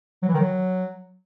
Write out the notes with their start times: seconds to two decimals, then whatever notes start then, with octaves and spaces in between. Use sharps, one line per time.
0.23 F#3
0.28 E3
0.34 D#3
0.39 F#3